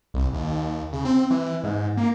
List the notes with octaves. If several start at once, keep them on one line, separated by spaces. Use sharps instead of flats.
C2
D#2
C#3
C4
E3
G#2
A#3